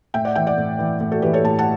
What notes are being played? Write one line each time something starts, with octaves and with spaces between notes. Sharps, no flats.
A2 E5 G5
D5 F#5
E3 E5 G5
D5 F#5
A2
E3
A2
F#4 A4
E3 G4 B4
A4 C#5
A2 A5
F#5 A5